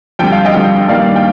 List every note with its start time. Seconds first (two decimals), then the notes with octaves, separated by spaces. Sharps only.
0.19 F2 D3 G3 G5
0.32 F5
0.45 D#5 G5
0.54 F2 D3 G3
0.88 G2 D#3 G3 A#3 D5 F5
1.16 G5